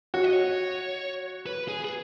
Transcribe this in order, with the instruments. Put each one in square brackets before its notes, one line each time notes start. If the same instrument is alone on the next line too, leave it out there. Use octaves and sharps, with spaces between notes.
[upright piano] F#4 [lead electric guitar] C#5
[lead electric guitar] D#5
C#5
B4
G#4
G#4